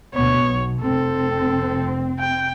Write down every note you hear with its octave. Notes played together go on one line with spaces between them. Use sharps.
D2 B2 B3 C#5
B1
F1 C4 A4
G5